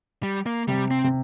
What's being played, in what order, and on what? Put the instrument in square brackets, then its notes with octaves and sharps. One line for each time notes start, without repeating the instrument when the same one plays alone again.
[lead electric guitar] G3
A#3
[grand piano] C3 [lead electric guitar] G3
[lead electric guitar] C4
[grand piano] C3